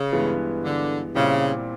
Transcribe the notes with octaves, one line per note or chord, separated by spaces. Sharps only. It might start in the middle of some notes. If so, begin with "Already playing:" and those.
Already playing: C#3
G2 E3 G#3 B3
D3
A#2 C#3 G3 C4 E4 G4